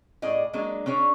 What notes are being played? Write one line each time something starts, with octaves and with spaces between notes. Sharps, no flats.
A2 G#4 D5 D#5
F#3 G#3 A#3 D4
C#4 D4 G#4 C#5